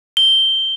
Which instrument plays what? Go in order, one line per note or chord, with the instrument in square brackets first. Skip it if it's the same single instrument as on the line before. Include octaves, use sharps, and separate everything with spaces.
[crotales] G7